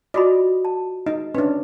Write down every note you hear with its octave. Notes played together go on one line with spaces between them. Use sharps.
F4 F#4 D5 D#5 B5
A5
D#4 D#5
C#4 D4 B4